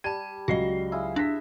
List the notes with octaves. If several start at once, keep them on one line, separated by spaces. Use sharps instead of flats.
G3 A5 G#6 D#7
C#2 F#3 F#4 D#5 C7
E4 F4 G#4
D4 E5 A#6 B6